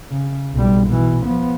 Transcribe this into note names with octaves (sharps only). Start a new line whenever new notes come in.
C#3
B1 G3
B2 E3
F3 B3